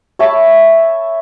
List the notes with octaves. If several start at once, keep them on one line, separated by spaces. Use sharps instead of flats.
C#5 E5 A5 B5